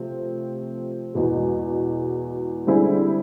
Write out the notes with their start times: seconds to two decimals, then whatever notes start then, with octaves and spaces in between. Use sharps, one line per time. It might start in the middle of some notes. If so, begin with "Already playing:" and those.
Already playing: C3 F3 A3 C4
1.14 E2 B2 G#3
2.67 D3 G3 C4 E4 G#4